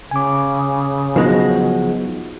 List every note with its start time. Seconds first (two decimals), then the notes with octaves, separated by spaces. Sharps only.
0.11 C#3 G#5 D6
1.16 F3 F#3 G#3 B3 D#4 F#4